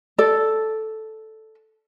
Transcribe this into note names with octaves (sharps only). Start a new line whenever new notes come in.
A4 D5